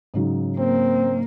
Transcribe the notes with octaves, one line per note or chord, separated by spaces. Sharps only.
G#2 C#3 F#3
A#3 C4